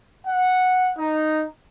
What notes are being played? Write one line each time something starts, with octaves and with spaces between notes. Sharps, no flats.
F#5
D#4